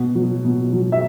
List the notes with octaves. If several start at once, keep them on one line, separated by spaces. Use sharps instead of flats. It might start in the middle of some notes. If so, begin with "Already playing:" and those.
Already playing: B2
F#3
B2
F#3
E5